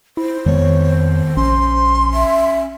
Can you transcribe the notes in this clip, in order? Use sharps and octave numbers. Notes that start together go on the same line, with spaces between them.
E4 C5
F2 D#3 G#3 B3 C#5
A#1 C#4 C6
E5